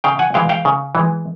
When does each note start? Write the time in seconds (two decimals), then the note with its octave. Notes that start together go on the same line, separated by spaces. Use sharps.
0.04 C#3 F5 G5
0.19 F#5 G#5
0.34 E3 G#3 F5 G5
0.49 F5 G5
0.65 C#3
0.95 E3 G#3